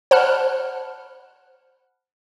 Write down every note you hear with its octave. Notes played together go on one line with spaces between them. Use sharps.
C5 F#5 A5 B5 F6 F#6